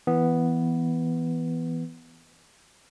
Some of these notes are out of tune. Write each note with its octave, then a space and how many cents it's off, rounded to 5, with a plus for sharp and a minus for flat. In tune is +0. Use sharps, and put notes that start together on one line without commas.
E3 +0 B3 +0